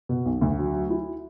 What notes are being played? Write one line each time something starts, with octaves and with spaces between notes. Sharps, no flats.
B2
B1
D2
F#3
F#3
E4